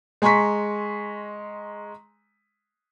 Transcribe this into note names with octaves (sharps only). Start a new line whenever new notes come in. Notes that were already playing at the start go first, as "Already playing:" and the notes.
G#3 G#5 A#5 C6 C#6 B6